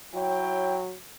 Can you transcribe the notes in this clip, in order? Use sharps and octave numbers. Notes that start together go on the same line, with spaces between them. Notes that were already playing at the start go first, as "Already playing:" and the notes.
F#3 E4 C#5 G5